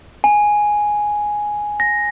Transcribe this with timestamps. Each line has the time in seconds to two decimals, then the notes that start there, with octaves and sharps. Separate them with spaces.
0.24 G#5
1.80 A#6